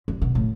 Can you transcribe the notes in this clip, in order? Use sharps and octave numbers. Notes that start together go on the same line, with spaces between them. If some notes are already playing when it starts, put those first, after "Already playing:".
D3
B2
A2